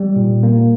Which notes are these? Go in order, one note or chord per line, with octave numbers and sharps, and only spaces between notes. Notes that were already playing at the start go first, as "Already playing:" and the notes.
Already playing: G3
A#2
A#3